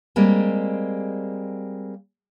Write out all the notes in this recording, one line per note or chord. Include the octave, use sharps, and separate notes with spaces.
G3 G#3 A#3 C4